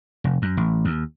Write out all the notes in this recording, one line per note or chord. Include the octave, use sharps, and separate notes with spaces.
F1
F#2
A1
D#2